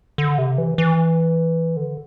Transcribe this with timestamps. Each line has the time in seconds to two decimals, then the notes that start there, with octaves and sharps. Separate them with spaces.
0.18 D3
0.38 C3
0.58 E3
0.78 E3
1.77 D3